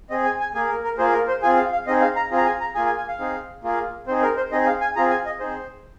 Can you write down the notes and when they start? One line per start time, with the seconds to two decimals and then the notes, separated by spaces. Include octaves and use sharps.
0.10 C4 G#4 D#5
0.25 G#5
0.40 G#5
0.54 A#3 G#4 G#5
0.69 A#4
0.84 A#4
0.98 A#3 F4 G#4 C5
1.13 A#4
1.28 C5
1.42 C4 F4 G#4 G#5
1.57 F5
1.72 F5
1.87 C4 D#4 G#4 D#5
2.01 F5
2.16 A#5
2.31 C4 F4 G#4
2.37 A#5
2.46 G#5
2.60 A#5
2.75 A#3 F4 G#4 G#5
2.86 G#5
2.97 G#5
3.08 F5
3.19 C4 D#4 G#4
3.63 A#3 F4 G#4
4.07 C4 D#4 G#4 C5
4.22 A#4
4.37 C5
4.52 C4 D#4 G#4 D#5
4.66 F5
4.81 G#5
4.96 C4 F4 G#4 A#5
5.10 G#5
5.26 D#5
5.40 C4 D#4 G#4 C5